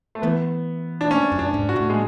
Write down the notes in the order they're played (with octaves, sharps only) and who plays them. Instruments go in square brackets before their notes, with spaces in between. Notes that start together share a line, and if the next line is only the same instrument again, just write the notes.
[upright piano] A3
[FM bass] E3 [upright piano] B3
[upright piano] D4
C#4
[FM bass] F#2
[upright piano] D4
[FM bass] G#2
[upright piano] F#4
[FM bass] A2
[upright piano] G#3